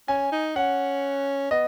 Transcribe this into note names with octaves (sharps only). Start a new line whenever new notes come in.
C#4 G#5
D#4
C#4 F#5
B3 D#5